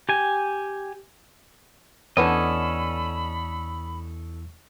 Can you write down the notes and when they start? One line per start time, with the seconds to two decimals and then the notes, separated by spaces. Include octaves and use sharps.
0.09 G4 G#5
2.17 E2 D3 B3 C#4 E4 A4 D#5 B5